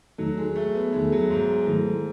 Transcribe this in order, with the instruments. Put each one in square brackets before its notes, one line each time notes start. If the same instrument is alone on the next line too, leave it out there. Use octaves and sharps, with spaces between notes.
[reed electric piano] E2 D#3 A3 D#4 A4 [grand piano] F#3
[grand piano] G#3
A3
B3
[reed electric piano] E2 D#3 A3 D#4 A4 [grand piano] G#3
[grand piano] F#3
G#2
[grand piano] G#2 [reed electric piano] D#3 F#3 A3 E4 A4